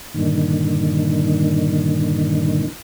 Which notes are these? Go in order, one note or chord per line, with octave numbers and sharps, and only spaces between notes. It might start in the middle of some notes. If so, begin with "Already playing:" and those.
G2 A#2 D3 D#3